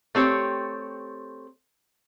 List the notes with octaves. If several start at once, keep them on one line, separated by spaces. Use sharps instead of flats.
A3 C4 G4 C#5